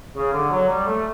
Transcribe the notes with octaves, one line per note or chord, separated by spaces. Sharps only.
C#3
D3
F#3
G3
A3